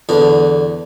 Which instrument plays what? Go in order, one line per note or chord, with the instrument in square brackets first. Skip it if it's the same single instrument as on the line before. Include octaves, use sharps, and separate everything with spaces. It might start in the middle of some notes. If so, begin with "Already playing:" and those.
[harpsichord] E2 D3